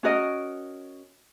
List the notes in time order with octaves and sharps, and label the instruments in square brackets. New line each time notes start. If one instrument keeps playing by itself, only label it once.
[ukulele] C#4 F#4 A#4 D#5